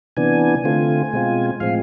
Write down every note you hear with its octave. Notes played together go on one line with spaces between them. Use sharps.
C3 E3 B3 D4 G#5
D3 A3 C4 F4
B2 G#3 C4 F4
A2 F3 G#3 C4 F5